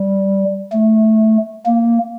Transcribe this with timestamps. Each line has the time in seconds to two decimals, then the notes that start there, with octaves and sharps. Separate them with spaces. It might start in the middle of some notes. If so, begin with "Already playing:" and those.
Already playing: G3
0.73 A3
1.66 A#3